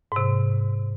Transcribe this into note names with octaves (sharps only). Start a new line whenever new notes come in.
G#2 C3